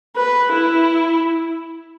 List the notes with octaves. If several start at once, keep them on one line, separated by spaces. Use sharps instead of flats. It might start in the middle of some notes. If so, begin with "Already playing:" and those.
B4
E4